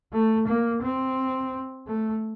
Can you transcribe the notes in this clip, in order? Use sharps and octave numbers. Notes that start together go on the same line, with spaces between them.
A3
A#3
C4
A3